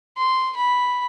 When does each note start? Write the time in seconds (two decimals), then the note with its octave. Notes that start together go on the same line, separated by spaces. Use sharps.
0.17 C6
0.57 B5